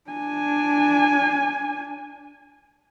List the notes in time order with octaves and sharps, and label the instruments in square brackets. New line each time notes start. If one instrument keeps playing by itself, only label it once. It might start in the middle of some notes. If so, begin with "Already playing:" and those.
[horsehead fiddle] D4 G#5